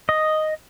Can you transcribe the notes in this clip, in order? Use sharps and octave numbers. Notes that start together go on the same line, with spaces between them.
D#5